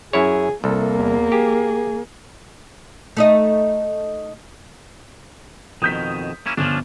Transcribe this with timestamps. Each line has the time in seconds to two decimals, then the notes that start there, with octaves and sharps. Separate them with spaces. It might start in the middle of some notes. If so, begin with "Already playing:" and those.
0.13 F#2 E4 G#4 C#5
0.64 C2 A#3 A4
0.97 E2
1.32 G4 G#4
3.17 A3 D#4 D#5
5.82 F2 B2 D#3 D#6 G6 B6
6.46 A#3 C#4 E4
6.57 G1 F3 C#4 D4 D6